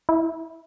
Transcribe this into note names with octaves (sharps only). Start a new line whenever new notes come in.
E4